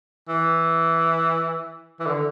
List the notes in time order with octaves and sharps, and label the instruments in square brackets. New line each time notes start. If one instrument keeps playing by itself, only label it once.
[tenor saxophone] E3
E3
D3